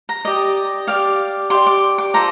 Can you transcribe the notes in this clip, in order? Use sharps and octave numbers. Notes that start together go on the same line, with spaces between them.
A#5
G4 D5 D#5
G4 D5 F5
G4 D5 C6
D6
D6
F4 A4 C5 A#5